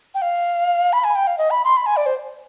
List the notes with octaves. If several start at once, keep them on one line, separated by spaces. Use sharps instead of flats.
G5
F5
B5
G#5
G5
F5
D#5
B5
C6
B5
G#5
D5
C5